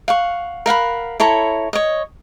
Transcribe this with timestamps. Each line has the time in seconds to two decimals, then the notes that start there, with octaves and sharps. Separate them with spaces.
0.08 F5 F#5 C#6
0.66 A#4 F5 F#5 B5
1.20 E4 A4 C#5 A#5
1.73 C#5 D#5